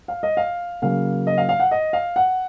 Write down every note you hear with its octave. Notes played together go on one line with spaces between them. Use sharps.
F5
D#5
F5
C#3 F#3 A#3 F5
D#5
F5
F5
F#5
D#5
F5
F#5